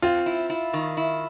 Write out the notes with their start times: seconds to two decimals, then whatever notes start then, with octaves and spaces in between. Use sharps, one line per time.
0.02 C4 F4
0.26 E4
0.50 E4
0.73 D#3
0.97 E4